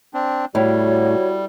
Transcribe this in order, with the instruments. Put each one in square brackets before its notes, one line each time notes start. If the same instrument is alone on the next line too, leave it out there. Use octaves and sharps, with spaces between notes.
[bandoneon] C4 D4
[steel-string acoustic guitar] A2 [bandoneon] G3 [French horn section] F#4 [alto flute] C#5